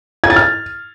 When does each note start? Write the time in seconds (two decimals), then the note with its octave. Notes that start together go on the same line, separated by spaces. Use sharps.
0.24 G#6
0.30 A6
0.36 F6